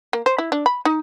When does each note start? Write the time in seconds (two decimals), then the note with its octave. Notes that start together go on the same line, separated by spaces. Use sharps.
0.13 A#3
0.26 C5
0.38 E4
0.52 D4
0.66 B5
0.85 D#4